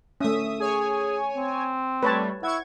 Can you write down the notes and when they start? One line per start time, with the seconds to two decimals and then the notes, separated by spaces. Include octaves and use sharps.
0.21 A3 C#4 E5 D#6
0.60 G#4 C#5 G#5
1.36 C4
2.03 G3 A3 B4 C#5 A5
2.43 E4 F#5 C#6 G#6